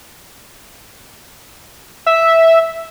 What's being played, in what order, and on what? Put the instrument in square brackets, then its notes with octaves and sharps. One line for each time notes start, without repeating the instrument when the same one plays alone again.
[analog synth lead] E5